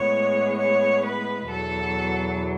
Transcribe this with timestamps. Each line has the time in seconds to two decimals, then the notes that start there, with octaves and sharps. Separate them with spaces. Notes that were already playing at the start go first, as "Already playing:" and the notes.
Already playing: A2 G#3 B3 C#5
0.58 C#5
1.03 B4
1.47 E2 B2 F#3 A4